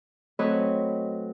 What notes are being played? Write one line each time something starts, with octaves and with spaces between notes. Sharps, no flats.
F#3 A3 C4 B4 C#5 D#5